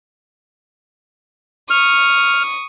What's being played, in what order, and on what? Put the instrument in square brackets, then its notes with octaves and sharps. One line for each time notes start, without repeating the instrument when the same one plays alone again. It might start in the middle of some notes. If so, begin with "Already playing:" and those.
[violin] C#6 D#6 [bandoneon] F6